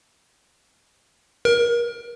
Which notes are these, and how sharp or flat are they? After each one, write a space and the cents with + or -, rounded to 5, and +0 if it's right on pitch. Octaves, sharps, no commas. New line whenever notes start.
A#4 +30